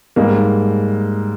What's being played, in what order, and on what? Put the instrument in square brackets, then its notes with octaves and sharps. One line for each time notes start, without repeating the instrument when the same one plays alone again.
[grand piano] G#2 G3 A#3 D#4